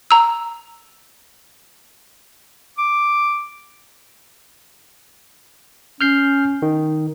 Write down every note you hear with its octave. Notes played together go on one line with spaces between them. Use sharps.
A#5 E6
D6
C#4 F6 G6 C7
D#3